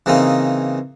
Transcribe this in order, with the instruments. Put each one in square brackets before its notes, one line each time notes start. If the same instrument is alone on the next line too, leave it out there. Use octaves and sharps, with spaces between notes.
[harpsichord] C#3 E3 A#3 C4 D#4 G#4